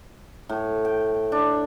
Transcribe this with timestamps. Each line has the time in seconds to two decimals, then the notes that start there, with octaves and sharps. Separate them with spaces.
0.49 A2
0.85 G5
1.32 D4